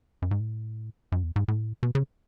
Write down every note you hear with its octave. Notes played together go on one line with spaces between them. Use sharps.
F#2
G#2
A2
F#2
E2
G#2
A2
B2
C#3